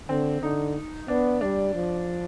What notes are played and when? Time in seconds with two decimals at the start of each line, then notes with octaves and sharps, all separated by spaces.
0.09 D3 C4
0.42 D3 D#4
1.08 B3 D4
1.41 G3 D4
1.75 F3